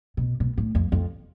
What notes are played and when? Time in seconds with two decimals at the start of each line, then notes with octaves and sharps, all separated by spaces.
0.17 B2
0.40 B2
0.58 A2
0.75 F2
0.92 F2